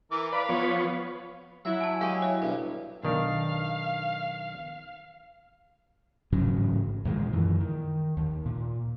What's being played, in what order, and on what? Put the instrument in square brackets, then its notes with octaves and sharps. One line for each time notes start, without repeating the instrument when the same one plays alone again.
[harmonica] E3 A#4 D6
[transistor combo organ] B4 D5 [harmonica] F5 B5
[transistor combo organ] F3 B3 C#5
[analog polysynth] F#3 E4 [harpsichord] E5
[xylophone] G#5 A5
[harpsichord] G#3 G4 [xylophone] F5 C#6 D#7
[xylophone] C#5 E5
[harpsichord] G2 B2 [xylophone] A4
[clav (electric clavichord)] B1 D#3 D4 [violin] F5
[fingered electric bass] A1 G#2 C#3 F#3
E2 A#2 D#3 G#3
F#2 E3
D#3
D#2
A#2